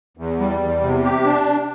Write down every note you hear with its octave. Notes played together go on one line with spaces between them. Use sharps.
E2
G3
E2
C3
G4
D4